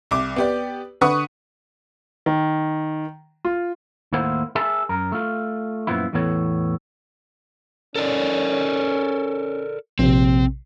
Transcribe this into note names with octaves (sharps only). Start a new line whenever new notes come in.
C2 D6
B3 G4 D5
D3 B4 F#5 C#6 D#6
D#3
F4
D#2 A2 A#3 E4 C5 F#5
G#4 A#4 E5 G#5 A5
F#2 A#4
A3 F4
F#2 A#2 F3 B3 E4
E2 A2 E3 B3 A4 C#5
C#4 A4 A#4 D5
A#1 C3 C4